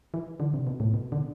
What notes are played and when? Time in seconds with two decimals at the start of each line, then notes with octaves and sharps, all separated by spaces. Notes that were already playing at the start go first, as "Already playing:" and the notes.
0.14 E3
0.40 D3
0.54 C3
0.67 B2
0.80 A2
0.94 B2
1.12 D3